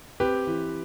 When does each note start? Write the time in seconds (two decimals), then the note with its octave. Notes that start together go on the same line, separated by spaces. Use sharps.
0.20 C4 G4 B4
0.47 E3